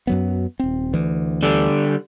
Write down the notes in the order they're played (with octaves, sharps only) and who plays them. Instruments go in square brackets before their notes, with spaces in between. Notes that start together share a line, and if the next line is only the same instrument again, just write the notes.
[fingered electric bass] F#2 F#3 B3
D#1 C4
D2 E3
[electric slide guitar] D3 G3